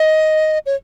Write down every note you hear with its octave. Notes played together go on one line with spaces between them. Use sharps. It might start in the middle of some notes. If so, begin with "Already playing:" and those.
Already playing: D#5
C#5